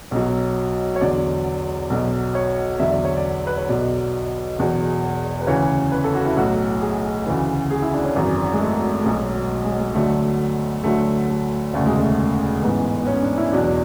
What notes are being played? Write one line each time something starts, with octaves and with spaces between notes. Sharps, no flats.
B1 B2 F#3
C#5
E2 D3 F#3 D5
B1 B2 F#3
C#5
E2 D3 F#3 E5
D5
C#5
D5
B4
C#5
B1 B2 F#3 D5
E1 E2 B2 F#3
B4
D2 C#3 E3 C#5
B4
A4
F#4
E4
B1 A2 F#3 F#4
G#4
D2 C#3 E3
G#4
E4
D4
C#4
G#1 F#2 E3
G#3
A3
A3
B1 B2 F#3 G#3
G#3
G#3
D2 D3 F#3 A3
D2 D3 F#3 A3
A3
E1 D2 C#3 A3
G#3
A3
A1 G#2 E3 B3
B3
C#4
D4
E4
E2 B2 F#3 D4